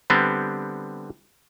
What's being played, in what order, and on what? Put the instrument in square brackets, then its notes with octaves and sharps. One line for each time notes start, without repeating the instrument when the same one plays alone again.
[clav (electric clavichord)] D3 G3 B3 C4